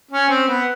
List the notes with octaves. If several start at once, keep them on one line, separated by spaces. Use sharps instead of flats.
C#4
C4
B3